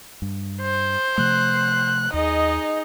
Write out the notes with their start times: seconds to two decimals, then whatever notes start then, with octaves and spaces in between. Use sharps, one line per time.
0.22 G2
0.62 C5
1.18 C3 F3 A3 F#6
2.14 D#2 D#4 G#4 D#5